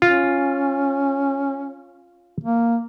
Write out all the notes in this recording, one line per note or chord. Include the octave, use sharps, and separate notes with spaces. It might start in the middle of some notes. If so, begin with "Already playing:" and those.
C#4 F4
A#3